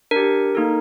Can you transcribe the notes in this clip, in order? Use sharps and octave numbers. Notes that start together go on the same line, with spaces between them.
D4 G4 A#4
A#3 D#4 A4